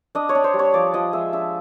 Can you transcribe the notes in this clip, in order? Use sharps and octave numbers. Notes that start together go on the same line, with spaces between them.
D4 D#5
C#5
D4
C5
G3
C#5
F3 D5
F3 D#5
G#3 E5
D4 E5